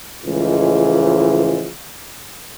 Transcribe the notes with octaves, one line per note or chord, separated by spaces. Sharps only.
C#2 A2 E3 F3 G#3